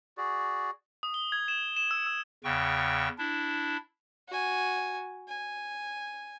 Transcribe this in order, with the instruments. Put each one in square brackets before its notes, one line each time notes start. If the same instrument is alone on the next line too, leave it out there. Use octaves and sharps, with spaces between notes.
[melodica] F#4 G#4 D5
[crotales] D#6
G7
G#6
E7
E7
E6
E6
[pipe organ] E2 C#3 G5 C#6
D4 E4
[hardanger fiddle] F#4 G#5
G#5